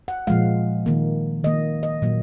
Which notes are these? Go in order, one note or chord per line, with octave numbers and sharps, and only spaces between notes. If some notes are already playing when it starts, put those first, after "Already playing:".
F#5
A#2 F3 G#3 F5
D#3 A#3
D#3 A#3 D#5
D#5
A#2 F#3 A#3